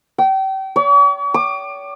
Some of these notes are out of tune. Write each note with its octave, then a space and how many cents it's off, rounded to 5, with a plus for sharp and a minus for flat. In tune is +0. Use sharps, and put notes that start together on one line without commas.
G5 -30
C#5 +45
D6 +30